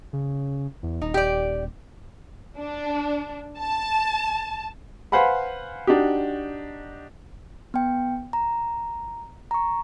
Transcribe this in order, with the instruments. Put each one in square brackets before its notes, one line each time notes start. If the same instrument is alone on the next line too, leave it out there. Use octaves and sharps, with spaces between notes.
[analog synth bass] C#3
E2
[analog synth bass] D#1 [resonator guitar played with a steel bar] D#4
[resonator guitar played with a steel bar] G4 D5
[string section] D4
A5
[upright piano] B4 C5 F5 F#5 G#5 B5
D4 D#4 F#4 G4
[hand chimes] B3 G5
A#5
A#5 C#6